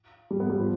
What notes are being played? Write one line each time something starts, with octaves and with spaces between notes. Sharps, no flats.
G3
B3
G3
F3